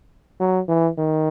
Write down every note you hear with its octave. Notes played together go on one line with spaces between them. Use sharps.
F#3
E3
D#3